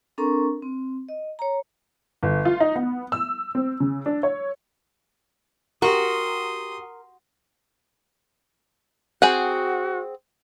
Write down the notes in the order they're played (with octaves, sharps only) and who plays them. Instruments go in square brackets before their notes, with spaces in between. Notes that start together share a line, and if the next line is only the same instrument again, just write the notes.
[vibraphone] C4 D4 A4 A#4 A#5 C#6
C4
D#5
C#5 A#5
[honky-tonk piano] G1
F4
D#4
B3
E6
C4
C#3
D4
C#5
[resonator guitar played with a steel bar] F#4 [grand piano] G4 A#5 [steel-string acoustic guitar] A#4 [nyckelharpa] C6 D#6
[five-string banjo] C4 G#4 F#5 [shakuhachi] F#4